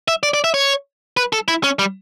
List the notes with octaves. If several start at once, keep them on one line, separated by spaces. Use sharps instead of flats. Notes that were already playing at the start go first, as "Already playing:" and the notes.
E5
D5
D5
E5
C#5
B4
A4
E4
C#4
G3